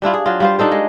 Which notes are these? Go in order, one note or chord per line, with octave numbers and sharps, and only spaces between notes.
G3 D4 E4 F4
G#4
F#3 F4
G3 F4 C5
D4 D#4 A4 C5
G#3